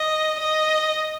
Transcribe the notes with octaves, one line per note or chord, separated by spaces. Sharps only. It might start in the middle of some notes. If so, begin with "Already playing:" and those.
Already playing: D#5
D#5